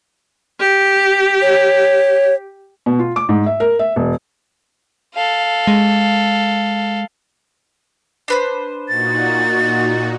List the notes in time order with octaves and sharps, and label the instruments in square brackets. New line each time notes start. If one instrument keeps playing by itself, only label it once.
[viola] G4
[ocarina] C#5
[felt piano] B2
F4
D6
G#2
E5
A#4
E5
E1
[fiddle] A4 F5
[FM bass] G#3
[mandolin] D4 B4 C5
[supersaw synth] A#2 D#4 F#4 [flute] A6